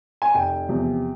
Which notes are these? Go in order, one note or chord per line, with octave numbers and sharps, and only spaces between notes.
G#5
F1 G5
E2 C3 F3